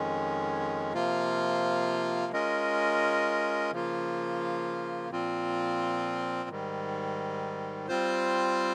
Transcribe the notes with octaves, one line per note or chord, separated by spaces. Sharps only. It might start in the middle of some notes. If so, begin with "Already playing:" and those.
Already playing: F2 D#3 G#3 C#4
C3 F3 A#3 F4
G#3 C#4 F4 A#4 D#5
C#3 F3 A#3 F4
A#2 F3 C4 F4
G#2 D#3 G3
G3 C4 F4 C5